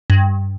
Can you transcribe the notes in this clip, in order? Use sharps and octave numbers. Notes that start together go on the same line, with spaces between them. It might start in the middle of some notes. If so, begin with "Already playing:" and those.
G2